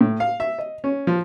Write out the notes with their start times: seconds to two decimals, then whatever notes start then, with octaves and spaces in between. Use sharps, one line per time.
0.01 A2
0.20 F5
0.40 E5
0.59 D#5
0.84 C#4
1.07 F3